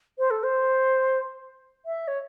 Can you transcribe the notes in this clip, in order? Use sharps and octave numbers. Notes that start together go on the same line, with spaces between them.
C5
A4
C5
E5
C#5